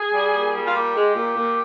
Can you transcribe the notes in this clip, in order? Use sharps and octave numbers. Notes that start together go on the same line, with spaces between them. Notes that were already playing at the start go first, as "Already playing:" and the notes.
Already playing: G#4
G3
A#2
G3
F4
A#2 G4
G#3
A#2
A#2